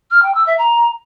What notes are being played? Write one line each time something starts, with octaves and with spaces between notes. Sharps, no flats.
F6
G5
E6
E5
A#5